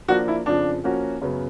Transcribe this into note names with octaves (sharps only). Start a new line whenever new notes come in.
F3 A#3 D4 F4 F#4
E4
F2 C#3 F3 D4
F3 A#3 C#4 F#4
F#2 C#3 F#3 B3